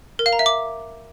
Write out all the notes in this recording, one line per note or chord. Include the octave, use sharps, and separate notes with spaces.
A#4
F5
A#5
E5
D6